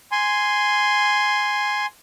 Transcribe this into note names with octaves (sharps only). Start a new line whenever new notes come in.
G#5 C6